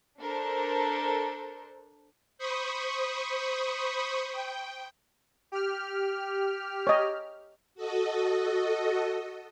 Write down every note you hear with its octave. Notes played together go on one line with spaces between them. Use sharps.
D4 A4 A#4 C5
C5 B5 C#6 D#6
G5
G4 F6
C#5 D#5
F#4 A4 D#5